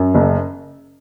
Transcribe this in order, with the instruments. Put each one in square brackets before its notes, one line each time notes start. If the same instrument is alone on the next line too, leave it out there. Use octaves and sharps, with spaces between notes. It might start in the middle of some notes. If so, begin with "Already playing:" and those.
Already playing: [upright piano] F#2
F#1